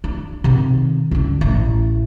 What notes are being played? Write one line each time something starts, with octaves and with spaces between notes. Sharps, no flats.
D4
C3 D#3
C#2 D3
A1